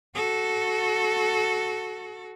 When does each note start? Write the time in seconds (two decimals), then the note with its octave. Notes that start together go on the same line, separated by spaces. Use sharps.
0.15 F#4 A4